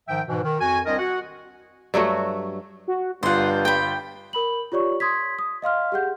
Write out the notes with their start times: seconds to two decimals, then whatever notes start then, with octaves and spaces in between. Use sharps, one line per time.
0.08 G#2 D#3 F3 E5 G5
0.28 G#2 B2 E3
0.43 D#3
0.61 F2 F#4 G#5
0.86 C2 C4 D4 A#4 D#5
0.99 F#4 F#5
1.94 G2 F#3 A3 F#4
2.88 F#4
3.23 G1 G2 F4 F#5 C6 G6
3.65 G5 B5
4.33 A#4 B5 F#7
4.72 F4 G4 C#5 D5 C#6
5.00 C6 D#6 G#6 B6
5.39 D#6
5.62 D#5 F5 C6 F6
5.92 G4 G#4 F#5 G6